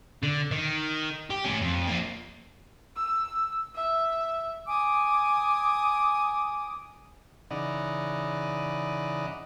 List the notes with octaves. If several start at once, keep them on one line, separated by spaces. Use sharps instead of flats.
D3
D#3
G4
A3 C#4
F2
F3 A#3
E6
E5
G#5 D6 D#6
C#3 E3 D#4 D5 D#5 F#5